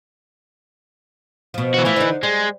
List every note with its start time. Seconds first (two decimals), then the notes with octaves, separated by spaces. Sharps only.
1.54 B2 F3
1.74 E3 F#4
1.85 E3 F3 A3
1.96 D3 D#4
2.23 G3 G#3